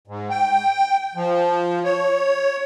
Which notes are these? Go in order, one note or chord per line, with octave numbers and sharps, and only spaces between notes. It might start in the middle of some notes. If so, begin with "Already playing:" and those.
G#2
G5
F3
C#5